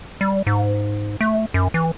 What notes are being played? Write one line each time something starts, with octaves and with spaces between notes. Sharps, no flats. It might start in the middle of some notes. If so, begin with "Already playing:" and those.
G3
G#2
A3
F#2
E3